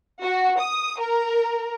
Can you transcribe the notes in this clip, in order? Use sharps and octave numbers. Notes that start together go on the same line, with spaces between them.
F#4
D#6
A#4